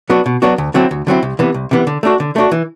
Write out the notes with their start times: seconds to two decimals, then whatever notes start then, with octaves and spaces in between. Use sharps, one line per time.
0.10 F#3 B3 D4 F#4
0.26 B2
0.42 F#3 B3 D4 F#4
0.58 D2
0.74 D3 F#3 C4 E4
0.91 D2
1.07 D3 F#3 C4 E4
1.23 C2
1.39 C3 E3 B3
1.54 C2
1.71 C3 E3 B3
1.87 D3
2.03 A3 D4 F#4
2.20 D3
2.36 A3 D4 F#4
2.52 E3